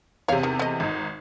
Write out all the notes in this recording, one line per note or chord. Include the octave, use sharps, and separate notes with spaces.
E2 C3 C#5 F5
D#3
A3 D#5
G#1 D#4